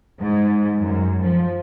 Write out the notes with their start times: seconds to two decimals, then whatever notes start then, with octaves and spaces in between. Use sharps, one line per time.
0.21 G#2
0.78 F#2
1.22 F3